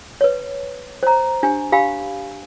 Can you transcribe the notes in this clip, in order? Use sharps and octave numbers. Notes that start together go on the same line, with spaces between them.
B4 C#5
C5 A#5
D4 G4 G#5
G4 F5 G#5 B5